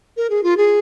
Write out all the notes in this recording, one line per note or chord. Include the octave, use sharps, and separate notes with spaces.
A#4
G#4
F4
G#4